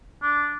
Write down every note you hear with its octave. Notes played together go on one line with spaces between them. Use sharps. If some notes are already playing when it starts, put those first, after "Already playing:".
D4